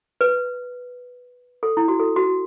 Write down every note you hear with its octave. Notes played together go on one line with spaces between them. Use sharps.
B4
A4
E4
F#4
A4
F#4